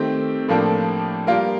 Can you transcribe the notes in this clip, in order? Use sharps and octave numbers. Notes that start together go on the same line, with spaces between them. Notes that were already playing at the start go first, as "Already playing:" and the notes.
Already playing: D#3 A3 C4 G4
A2 F3 A#3 D4 A4
G3 A#3 F4 A#4